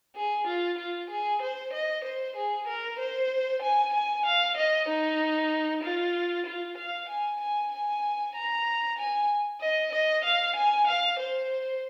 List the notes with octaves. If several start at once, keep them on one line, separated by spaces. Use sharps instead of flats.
G#4
F4
F4
G#4
C5
D#5
C5
G#4
A#4
C5
G#5
G#5
F5
D#5
D#4
F4
F4
F5
G#5
G#5
G#5
A#5
G#5
D#5
D#5
F5
G#5
F5
C5